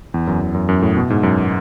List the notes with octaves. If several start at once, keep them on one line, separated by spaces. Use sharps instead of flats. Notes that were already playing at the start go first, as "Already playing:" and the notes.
E2
F#2
E2
F#2
F#2
A2
B2
G#2
F#2